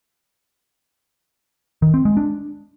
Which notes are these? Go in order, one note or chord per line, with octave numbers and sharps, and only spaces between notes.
D#3
C4
G#3
D4